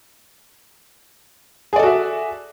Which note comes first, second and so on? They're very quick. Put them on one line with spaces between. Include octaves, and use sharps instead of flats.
G#4 D5 A4 F#4 E5